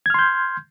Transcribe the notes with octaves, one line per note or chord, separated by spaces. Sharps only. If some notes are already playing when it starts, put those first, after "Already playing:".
C6 F6 G6 G#6